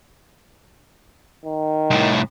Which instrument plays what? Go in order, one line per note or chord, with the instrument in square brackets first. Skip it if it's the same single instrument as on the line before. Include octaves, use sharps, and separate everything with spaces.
[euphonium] D#3
[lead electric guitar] C2 A2